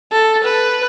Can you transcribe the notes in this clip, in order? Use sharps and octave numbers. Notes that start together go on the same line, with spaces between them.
A4
B4